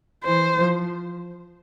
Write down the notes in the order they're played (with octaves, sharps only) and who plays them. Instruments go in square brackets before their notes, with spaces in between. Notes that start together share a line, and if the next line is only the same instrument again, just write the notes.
[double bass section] E3 [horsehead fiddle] C5
[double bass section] F3